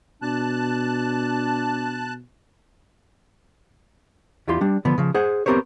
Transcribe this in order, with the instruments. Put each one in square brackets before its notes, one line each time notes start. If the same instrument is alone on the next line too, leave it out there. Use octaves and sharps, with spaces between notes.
[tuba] B2 [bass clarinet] D4 [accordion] A5 F#6
[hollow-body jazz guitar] E2 E4 F4 G4 C6
G3 D4
D3 F3 B3
C#3 F3
G#4 C5 F#5
B3 C4 G4 A#4 C5 C#5